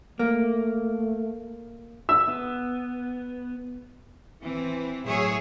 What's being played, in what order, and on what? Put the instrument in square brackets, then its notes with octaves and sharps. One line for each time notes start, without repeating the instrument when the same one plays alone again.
[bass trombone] A3 [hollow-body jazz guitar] A#3
[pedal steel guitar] E5 [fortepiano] E6
[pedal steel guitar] B3
[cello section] E3 C4
A2 F#3 G#4 C#5 E5